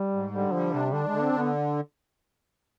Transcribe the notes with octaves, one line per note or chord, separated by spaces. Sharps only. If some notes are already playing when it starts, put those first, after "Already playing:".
Already playing: G3
G#2
D3 G3
F3 G3
C3 D4
D3 D4
G#3
D3
C4
D3
B3